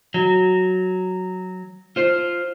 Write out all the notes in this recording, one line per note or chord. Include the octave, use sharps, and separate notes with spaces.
F#3
F4 C5